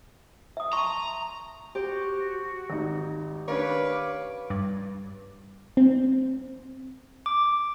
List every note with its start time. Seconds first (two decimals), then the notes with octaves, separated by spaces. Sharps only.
0.57 E5 D#6
0.73 A5 A#5 C6 C#6
1.75 F#4 G4 C5
2.70 G#1 D#4
3.48 D#3 C#4 D4 B4 C#5 F5 D6
4.50 G2
5.77 C4
7.26 D6